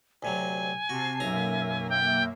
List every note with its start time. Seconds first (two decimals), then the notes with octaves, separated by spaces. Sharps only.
0.23 D2 C3 F#3 G#5
0.89 C3 F#4 A5 C7
1.20 B1 F#2 A#3 E5 A#5
1.90 G5